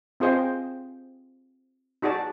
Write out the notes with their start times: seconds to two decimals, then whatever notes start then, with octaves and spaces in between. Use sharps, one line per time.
0.20 C4 F4 G#4 C5 D#5 G5
2.02 D#4 F#4 G#4 D5 A5